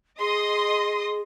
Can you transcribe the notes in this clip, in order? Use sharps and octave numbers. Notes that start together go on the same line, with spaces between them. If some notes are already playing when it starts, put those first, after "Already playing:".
G#4 D#5 C6 D#6